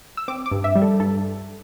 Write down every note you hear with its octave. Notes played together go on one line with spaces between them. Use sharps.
E6
C4 D6
D6
G2
E5
G3
A4
G2 A4